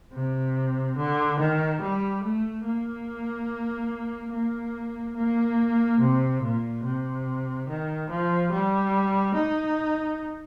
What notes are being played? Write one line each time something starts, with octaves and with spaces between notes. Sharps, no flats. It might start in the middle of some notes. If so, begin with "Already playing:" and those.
C3
D3
D#3
G3
A3
A#3
A#3
A#3
C3
A#2
C3
D#3
F3
G3
D#4